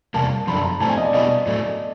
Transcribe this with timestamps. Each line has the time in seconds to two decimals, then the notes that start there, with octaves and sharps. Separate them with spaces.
0.14 E2 C3 G3 A#3 A5
0.47 F#2 D3 F3 B5
0.64 A#5
0.80 A2 F3 A3 C4 A5
0.89 G#5
0.97 D#5
1.05 D5
1.14 B2 G3 B3 E4 D#5
1.47 A2 F#3 A3